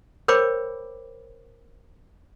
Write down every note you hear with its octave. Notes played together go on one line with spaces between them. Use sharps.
A#4 C5 C#5 G5 B5 D6